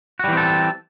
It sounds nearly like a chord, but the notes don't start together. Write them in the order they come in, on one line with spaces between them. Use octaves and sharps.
F#4 G3 E3 C4 A4